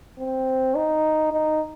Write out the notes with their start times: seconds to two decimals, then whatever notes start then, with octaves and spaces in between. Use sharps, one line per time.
0.19 C4
0.75 D#4
1.32 D#4